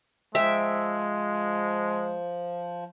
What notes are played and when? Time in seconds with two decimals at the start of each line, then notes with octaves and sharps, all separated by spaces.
0.35 F3 G#3 E5 G5